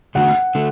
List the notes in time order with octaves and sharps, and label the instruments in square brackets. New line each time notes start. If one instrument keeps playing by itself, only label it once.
[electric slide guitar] E2 D3 A3 D4 F#4 [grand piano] F#5
[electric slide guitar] D3 A3